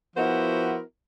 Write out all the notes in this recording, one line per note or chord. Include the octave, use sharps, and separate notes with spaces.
F3 B3 E4 F#4 A#4 C5